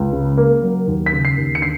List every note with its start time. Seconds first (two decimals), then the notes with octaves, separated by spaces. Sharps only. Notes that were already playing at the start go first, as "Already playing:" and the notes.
Already playing: C#2
0.13 C#3
0.37 A#3
0.63 F#3
0.87 D#2
1.06 B6
1.13 C#3
1.25 C7
1.37 D#2
1.55 C#7
1.62 D3 C7